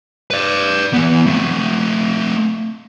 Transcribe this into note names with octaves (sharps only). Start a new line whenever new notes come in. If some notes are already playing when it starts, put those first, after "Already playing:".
B4 D5
E3 B3
A3 C4